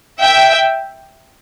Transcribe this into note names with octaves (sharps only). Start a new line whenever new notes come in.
E5 G5